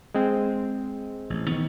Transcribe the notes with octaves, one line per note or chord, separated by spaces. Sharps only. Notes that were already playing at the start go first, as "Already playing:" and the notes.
G#3 C4
A1
D#3 E3 B3